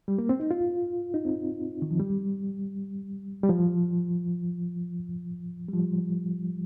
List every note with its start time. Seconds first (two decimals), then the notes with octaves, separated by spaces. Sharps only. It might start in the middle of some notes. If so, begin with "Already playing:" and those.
0.08 G3
0.18 A#3
0.29 C4
0.40 D#4
0.51 F4
1.14 D#4
1.25 C4
1.82 D#3
1.91 F3
1.99 G3
3.43 G3
3.49 F3
5.69 G3
5.73 F3